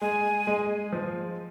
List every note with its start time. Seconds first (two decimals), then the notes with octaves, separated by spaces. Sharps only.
0.01 G#3 G#5
0.47 G#3
0.93 F3